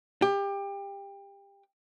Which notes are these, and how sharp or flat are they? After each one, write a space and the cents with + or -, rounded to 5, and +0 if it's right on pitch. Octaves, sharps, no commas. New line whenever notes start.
G4 +25